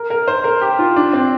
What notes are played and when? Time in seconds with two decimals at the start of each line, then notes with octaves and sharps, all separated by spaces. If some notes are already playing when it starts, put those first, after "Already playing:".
Already playing: A#4
0.10 A#4
0.28 C5
0.44 A#4
0.62 G4
0.79 F4
0.96 D4
1.13 C4